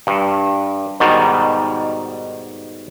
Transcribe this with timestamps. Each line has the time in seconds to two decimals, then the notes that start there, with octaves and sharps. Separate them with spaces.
0.07 G2
1.00 G#2 B2 D#3 G3